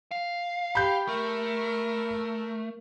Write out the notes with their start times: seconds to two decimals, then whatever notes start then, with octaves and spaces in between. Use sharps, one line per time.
0.11 F5
0.75 G4 B5 G6
1.08 A3 A#4